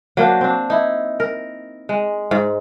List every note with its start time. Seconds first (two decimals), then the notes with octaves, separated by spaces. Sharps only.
0.17 F#3 A#3 D4 C5
0.41 C4 D4
0.70 D#4 E4
1.20 A#4
1.89 G#3
2.31 G#2